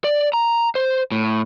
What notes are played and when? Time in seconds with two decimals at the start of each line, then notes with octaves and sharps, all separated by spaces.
0.04 D5
0.33 A#5
0.75 C5
1.11 A2